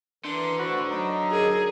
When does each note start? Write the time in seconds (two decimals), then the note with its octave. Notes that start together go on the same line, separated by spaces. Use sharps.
0.25 D3 E3 A#4 C6
0.59 A2 F#4 B4 C5
0.91 F#3 D#4 D#5
1.31 G#4 A#4